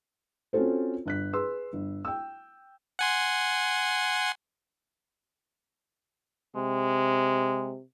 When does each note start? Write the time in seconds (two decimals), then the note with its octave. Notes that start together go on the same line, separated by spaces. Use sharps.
0.53 C4 C#4 F4 F#4 A4 C5
1.06 G1 F#6 B6
1.33 G#4 B4 C6 E6
1.73 G1
2.05 G5 E6
2.99 F#5 G#5 C6
6.56 C3 G#3